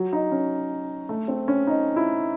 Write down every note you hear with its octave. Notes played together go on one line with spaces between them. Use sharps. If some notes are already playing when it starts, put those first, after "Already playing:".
Already playing: F#3
D#4
C#4
A3
C4
C#4
D#4
E4